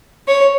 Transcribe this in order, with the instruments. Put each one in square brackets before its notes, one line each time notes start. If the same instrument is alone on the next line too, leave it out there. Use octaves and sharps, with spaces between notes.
[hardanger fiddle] C#5